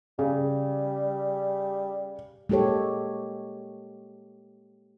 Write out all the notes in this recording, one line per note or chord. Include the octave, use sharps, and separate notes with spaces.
C#3 G3
G#3 A#3 G4 A4 C#5